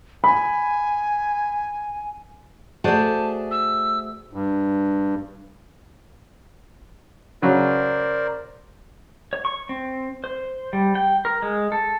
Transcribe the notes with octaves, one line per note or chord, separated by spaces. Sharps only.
G#5 B5
A3 F#4 G#4 C5 D5 A5
E6
G2
C#3 F#3 A#4 C5 D5
C#5
C#6
C4
C5
G3
G5
A#4
G#3
A4